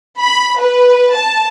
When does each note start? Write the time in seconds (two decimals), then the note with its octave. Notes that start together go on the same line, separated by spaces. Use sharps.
0.20 B5
0.60 B4
1.16 A5